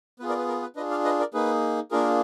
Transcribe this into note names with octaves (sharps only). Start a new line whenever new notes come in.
B3 F4 G#4 B4
A#4 D5
B4
A#4
B4
D4 F4 G#4 B4 D#5
D5 F5
B4 D#5
A#4 D5
A#3 D#4 G#4 B4
A#3 D4 F4 G#4 A#4